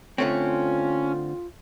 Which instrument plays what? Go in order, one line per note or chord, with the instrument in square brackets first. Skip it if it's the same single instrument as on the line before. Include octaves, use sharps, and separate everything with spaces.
[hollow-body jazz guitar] D3 A3 C4 [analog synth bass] C#4 [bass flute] F4